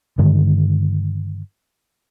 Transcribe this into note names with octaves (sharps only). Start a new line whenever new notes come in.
G2 D3 D#3 G#3